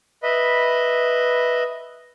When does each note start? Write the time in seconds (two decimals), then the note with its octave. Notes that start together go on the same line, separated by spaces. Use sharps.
0.23 B4 D#5 E5 B5